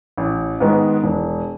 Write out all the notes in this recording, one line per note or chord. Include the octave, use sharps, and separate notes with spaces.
A1
G#2 D#3 G#3 B3
E1